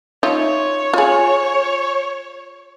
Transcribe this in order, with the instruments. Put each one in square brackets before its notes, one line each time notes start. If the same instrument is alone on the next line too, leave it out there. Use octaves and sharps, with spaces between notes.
[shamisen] D#4 F4 E5 [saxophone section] C#5
[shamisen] F4 G#4